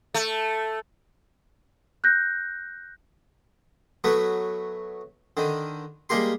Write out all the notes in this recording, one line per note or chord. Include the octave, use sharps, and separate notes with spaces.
A3
F#6 G6 A#6
F#3 A3 B3
D3 D#3
G3 G#3 A#3 G4 C6